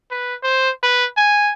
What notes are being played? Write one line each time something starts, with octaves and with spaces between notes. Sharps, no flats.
B4
C5
B4
G#5